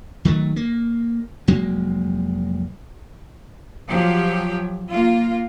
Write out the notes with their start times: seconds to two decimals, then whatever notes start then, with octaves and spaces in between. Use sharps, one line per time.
0.25 D#3 F#3 A3
0.56 A#3
1.48 F1 F#3 G#3 A#3
3.88 F3 F#3 G4
4.91 A#3 F4